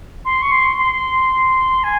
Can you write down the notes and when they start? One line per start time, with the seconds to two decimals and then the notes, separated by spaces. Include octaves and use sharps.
0.25 C6
0.42 C#6
0.52 C6
0.77 C6
1.84 G#5